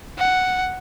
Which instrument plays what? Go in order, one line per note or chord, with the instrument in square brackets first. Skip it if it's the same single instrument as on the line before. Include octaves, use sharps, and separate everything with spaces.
[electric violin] F#5